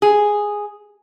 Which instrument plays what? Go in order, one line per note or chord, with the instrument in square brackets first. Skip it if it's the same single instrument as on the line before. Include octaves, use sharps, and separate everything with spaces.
[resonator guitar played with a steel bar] G#4